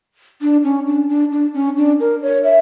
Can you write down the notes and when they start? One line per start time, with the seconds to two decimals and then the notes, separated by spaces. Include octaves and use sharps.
0.42 D4
0.64 C#4
0.87 D4
1.09 D4
1.32 D4
1.54 C#4
1.77 D4
2.00 A#4
2.22 C#5
2.44 E5